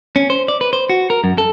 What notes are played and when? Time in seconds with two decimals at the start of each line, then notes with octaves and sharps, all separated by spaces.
0.16 C#4
0.30 C5
0.48 D5
0.61 B4
0.73 C5
0.89 F#4
1.10 A#4
1.24 F#2
1.38 A4